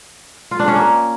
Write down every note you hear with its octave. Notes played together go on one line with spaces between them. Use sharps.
F4
D4
C#4
A#3